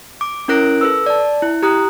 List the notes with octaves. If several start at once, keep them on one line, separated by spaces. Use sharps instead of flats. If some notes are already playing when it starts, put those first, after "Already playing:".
D6
C#4 E4 A#4 F#6 A#6 D7
A4 B4 E6
D5 A5
E4
G4 A#5 D#6 F#6